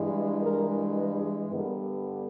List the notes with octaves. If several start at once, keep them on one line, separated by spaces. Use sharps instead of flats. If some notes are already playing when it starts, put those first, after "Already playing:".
Already playing: G2 E3 G#3
A#4
B4
G2 D3 G3 B3 A#4